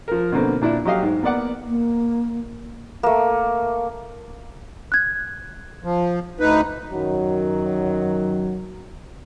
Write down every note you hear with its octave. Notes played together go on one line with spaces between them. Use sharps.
F3 A#4
B2 D3 A#3 C4
A#2 D4 E4
F#3 G4 D#5 F5
G#2
A#3 B3 D5 F#5
A#3
A3 A#3
F#6 G#6
F3
D2 D#4 B4
F#2 D#3 F#3